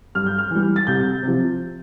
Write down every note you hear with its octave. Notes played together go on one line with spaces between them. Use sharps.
G2 F6
G6
F6
E3 G3
A6
C2 G6
C3
F3